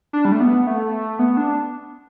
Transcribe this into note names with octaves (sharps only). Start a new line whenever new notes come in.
D4
G3
A3
B3
A3
B3
D4